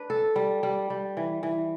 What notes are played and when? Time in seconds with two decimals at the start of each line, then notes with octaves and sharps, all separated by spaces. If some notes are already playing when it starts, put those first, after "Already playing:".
Already playing: D4 B4
0.10 A4
0.36 G3
0.63 G3
0.90 G3
1.17 E3
1.43 E3